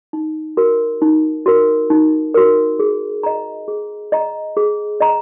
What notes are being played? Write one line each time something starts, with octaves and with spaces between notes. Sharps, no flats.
D#4
F#4 A#4
D#4
F#4 A#4
D#4
F#4 A#4
G#4
D#5 A#5
G#4
D#5 A#5
G#4
D#5 A#5